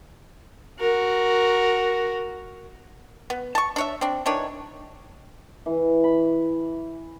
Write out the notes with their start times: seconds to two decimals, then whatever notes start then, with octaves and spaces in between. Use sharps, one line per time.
0.80 F#4 A#4
3.30 B3
3.55 A5 C#6
3.76 D4 C#5 E5
4.01 C4 D4
4.26 D#3 E3 D4 C#5
5.66 E3
6.04 B5